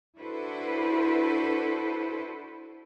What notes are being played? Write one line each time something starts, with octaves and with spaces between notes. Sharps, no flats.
D4 E4 F#4 A4 B4 C5